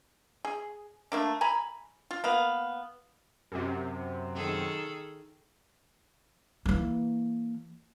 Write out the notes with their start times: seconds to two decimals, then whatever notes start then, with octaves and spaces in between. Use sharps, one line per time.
0.45 G#4
1.12 A3 A#3 D4
1.41 G#5 A#5 B5
2.11 F4
2.24 A#3 B3 F5
3.52 F#2 C3
4.35 D#3 G#4 A4
6.66 E3 A#3